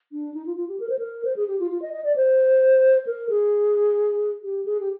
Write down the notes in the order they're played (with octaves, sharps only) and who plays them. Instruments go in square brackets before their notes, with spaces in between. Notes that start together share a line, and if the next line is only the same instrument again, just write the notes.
[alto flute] D4
D#4
F4
F4
G4
A#4
C5
A#4
C5
G#4
G4
F4
F4
D#5
D#5
D5
C5
A#4
G#4
G4
G#4
G4